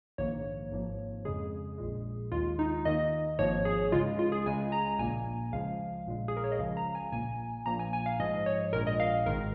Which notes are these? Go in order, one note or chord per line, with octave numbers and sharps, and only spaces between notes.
A#1 G#2 D#3 A#3 C#5
G#1 G#2 F3 A#3
F2 C#3 G#3 G#4
A#1 A#2 G#3
D#2 D#3 G#3 F4
D#4
D#2 D#3 A#3 D#5
G#1 G#2 F3 A#3 C#5
G#4
C#2 C#3 G#3 F4
F4
G#4
C#2 C#3 G#3 G#5
A#5
A#1 A#2 A#3 G#5
C#2 C#3 F3 G#3 F5
A#1 A#2 G#3
G#4
A#4
C#5
D#5
C#2 C#3 F3 G#3 F5
A#5
G#5
A#1 A#2 A#3 G#5
A#1 A#2 F3 A#3 A#5
G#5
G#5
F5
G#2 F3 G#3 D#5
C#5
A#1 A#2 G#3 A#4
D#5
F5
G#1 G#2 D#3 G#3 A#4